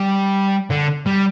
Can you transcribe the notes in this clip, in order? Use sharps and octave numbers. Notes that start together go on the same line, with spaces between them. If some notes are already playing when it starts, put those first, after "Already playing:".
Already playing: G3
D3
G3